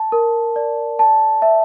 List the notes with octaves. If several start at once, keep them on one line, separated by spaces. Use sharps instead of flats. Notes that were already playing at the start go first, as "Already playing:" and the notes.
Already playing: A5
A#4
D5
A5
E5